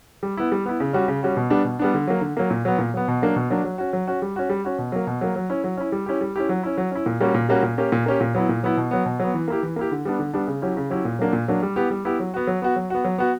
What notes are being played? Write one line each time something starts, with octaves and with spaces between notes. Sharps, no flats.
G3
B3 E4
G3
B3 E4
C#3
G3 C#4 F#4
C#3
G3 C#4 F#4
B2
G3 B3 D4
B2
G3 B3 D4
D3
F#3 A#3
D3
F#3 A#3
A#2
F#3 B3
A#2
F#3 B3
B2
F#3 A#3 D4
B2
F#3 A#3 D4
F#3
C#4 F#4
F#3
C#4 F#4
G3
C#4 F#4
G3
C#4 F#4
B2
F#3 A#3
B2
F#3 A#3
F#3
C#4 E4
F#3
C#4 E4
G3
C#4 E4 G4
G3
C#4 E4 G4
F#3
C#4 E4
F#3
C#4 E4
A#2
G3 A#3 C#4 F#4
A#2
G3 A#3 C#4 F#4
A#2
A#3 C#4 G4
A#2
A#3 C#4 G4
A#2
F#3 B3 E4
A#2
F#3 B3 E4
B2
F#3 B3
B2
F#3 B3
E3
A#3 E4 G4
E3
A#3 E4 G4
D3
G3 B3 D4
D3
G3 B3 D4
C#3
F#3 C#4 E4 G4
C#3
F#3 C#4 E4 G4
A#2
F#3 A#3 D4
A#2
F#3 A#3 D4
G3
B3 E4 G4
G3
B3 E4 G4
F#3
B3 F#4
F#3
B3 F#4
F#3
B3 F#4
F#3
B3 F#4